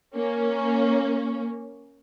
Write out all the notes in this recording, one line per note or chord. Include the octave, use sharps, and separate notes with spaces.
A#3 C#4